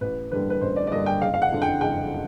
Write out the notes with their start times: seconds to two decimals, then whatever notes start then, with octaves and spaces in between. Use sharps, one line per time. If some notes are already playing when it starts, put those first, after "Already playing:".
0.01 A1 B4
0.31 G2 D3 G3 A#3 B4
0.50 B4
0.61 A1 C5
0.76 D5
0.87 D5
0.92 G2 D3 G3 A#3 D#5
1.06 G5
1.22 F#1 F5
1.34 F5
1.42 F#5
1.52 F2 D3
1.62 G5
1.81 F#1 G5